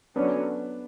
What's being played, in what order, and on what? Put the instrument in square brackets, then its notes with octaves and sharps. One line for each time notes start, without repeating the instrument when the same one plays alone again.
[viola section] D3 F#3 C#4 [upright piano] B3 D4